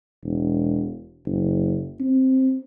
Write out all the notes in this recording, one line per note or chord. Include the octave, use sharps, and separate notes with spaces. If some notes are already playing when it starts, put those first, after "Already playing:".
E1
F#1
C4